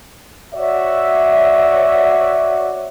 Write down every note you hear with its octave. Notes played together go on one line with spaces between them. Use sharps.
F#4 C#5 D5 E5